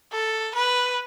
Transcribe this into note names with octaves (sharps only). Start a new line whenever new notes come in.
A4
B4